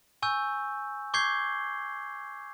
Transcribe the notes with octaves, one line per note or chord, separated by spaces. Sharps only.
G#5 C#6 E6 G6
C#6 D6 G6 G#6 C7 G7